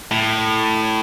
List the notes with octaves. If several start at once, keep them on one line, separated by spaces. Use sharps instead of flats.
A2